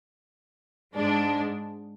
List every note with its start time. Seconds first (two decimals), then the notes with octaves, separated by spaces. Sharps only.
0.95 G#2 G#3 D4